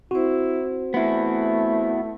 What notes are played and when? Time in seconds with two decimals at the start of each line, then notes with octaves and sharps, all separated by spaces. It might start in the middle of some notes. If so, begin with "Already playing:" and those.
0.11 C4 E4 F#4 C5
0.94 A3 B3 E4